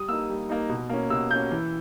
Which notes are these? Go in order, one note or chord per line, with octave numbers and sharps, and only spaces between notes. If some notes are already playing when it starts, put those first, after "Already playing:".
Already playing: G3 D#6
A#3 D#4 E6
G3
A#3 D#4
B2
A#3 C#4
B2 E6
A#3 C#4 G6
E3